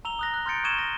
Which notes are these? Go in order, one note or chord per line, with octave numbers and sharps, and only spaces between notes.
A#5 E6 F7 G7
D#6 F#6 A#6
F#6
C6 F6 G6 A6 C#7 D7
C#6 D#6 G#6 D#7 E7 G7
A#6